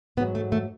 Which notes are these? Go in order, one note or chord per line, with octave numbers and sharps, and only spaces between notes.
G#2 F#3 B3
A3
A3